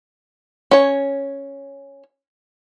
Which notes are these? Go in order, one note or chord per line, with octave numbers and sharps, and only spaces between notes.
C#4 C#5